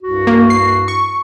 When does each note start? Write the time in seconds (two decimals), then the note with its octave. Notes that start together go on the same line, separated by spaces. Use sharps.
0.03 C2 G2 F#4
0.27 A#3
0.50 C7
0.88 C#6